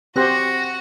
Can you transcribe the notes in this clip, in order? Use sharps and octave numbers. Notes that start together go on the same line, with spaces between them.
C4 F#4 G4 C5 F#5 F#6 A#6